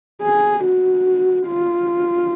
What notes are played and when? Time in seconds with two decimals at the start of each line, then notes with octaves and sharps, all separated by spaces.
0.22 G#4
0.64 F#4
1.48 F4